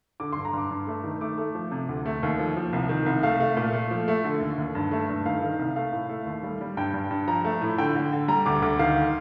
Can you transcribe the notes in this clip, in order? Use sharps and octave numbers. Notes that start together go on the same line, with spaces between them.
D3 D6
G2 C6
A#5
G2 D6
G2
A3
D#3
A3 D6
A3
F3
C3
D2
A3
D#2
F3
F3
C2
D#3
C2
A3 F5
A3
A#2
A3
F3
A3
D3
D#2
D#2
G2
A3
G2
D#3 F5
D#3
C2
A3 F5
A2
A3
D#2
G3
G3
G2 G5
G2
G2
F3 A#5
A3
A2
D3 G5
D3
D3
G3 A#5
D2 D6
D2 D6
D#3 F5